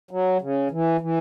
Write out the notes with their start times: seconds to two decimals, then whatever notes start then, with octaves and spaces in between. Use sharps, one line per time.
0.11 F#3
0.42 C#3
0.71 E3
1.01 E3